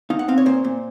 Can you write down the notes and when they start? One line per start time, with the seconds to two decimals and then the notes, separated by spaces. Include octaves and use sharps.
0.10 D#4 F5
0.19 F#5
0.28 C4 F5
0.38 C#5
0.46 A#2 C5
0.64 A#2